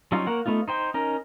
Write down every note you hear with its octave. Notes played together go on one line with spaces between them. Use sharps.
F#3 G3 C#4 D#4 F4
A#3 A#4 C#5 F#5
A3 B3 D#4 F4
D#4 C5 G5
C#4 D#4 A#4